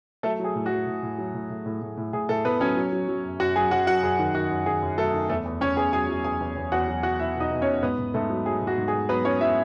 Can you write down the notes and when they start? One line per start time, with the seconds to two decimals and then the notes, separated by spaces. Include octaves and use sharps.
0.23 F#3 A3 A4
0.40 F#3 G#4
0.55 A2
0.66 F#4
0.71 F#3
0.87 A2
1.03 A2
1.18 F#3
1.34 A2
1.50 A2
1.66 A2
1.82 A2
1.97 A2
2.13 A2 G#4
2.29 A2 A3 A4
2.45 A2 B3 B4
2.61 F#3 C#4 C#5
2.77 F#3
2.93 F#3
3.08 F#3
3.24 F#2
3.40 F#2 F#4 F#5
3.56 F#3 G#4 G#5
3.71 F#2 F#4 F#5
3.87 F#3 F#4 F#5
4.03 F#2 G#4
4.19 D#3
4.34 D#3 F#4
4.51 F#2
4.66 D#3 G#4
4.82 F#2
4.98 F#3 A3 A4
5.14 D#3
5.29 E2 A3 A4
5.45 E2
5.61 E2 C#4 C#5
5.77 E2 G#4 G#5
5.93 F#3 G#4 G#5
6.09 F#3
6.24 E2 G#4 G#5
6.40 E2
6.56 E2
6.72 E2 F#4 F#5
6.88 F#3
7.03 F#3 F#4 F#5
7.19 E2 E4 E5
7.35 B2 D#4 D#5
7.51 B2
7.62 C#4 C#5
7.67 B2
7.83 G#2 B3 B4
7.99 G#2
8.14 G#2 A3 A4
8.30 F#3
8.46 F#3 G#4
8.61 G#2
8.67 F#4
8.78 G#2
8.88 G#4
8.93 G#2
9.09 F#3 B3 B4
9.25 F#3 C#4 C#5
9.41 F#3 E4 E5